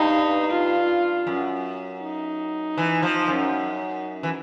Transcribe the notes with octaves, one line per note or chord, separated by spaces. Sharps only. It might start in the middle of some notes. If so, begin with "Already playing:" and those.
Already playing: G2 D#4
F4
F#2
D#4
E3
F3
F#2
E3